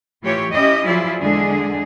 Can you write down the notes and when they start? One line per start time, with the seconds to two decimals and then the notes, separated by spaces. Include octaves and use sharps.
0.23 A2 E3 F4 G4 C#5
0.51 C#4 E4 G4 D#5
0.83 F3 F#3 E4 F4 G#4 D5
1.21 E2 D3 G#3 D4 G#4